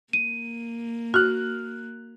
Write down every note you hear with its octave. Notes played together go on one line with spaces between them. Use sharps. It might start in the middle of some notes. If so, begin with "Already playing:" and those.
A#3 D#7
F#4 F6 F#6